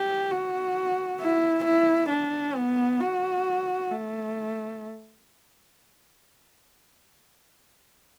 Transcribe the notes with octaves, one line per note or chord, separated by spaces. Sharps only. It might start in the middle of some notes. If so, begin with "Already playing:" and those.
Already playing: G4
F#4
E4
E4
D4
B3
F#4
A3